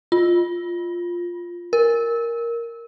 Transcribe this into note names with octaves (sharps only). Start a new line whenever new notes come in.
F4
A#4